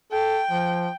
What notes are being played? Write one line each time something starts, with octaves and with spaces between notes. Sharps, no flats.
A4 G5
F3